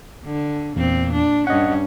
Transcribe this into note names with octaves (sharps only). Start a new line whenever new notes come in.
D3
E2 A#2 C4
D4
G2 C#4 D#5 F#5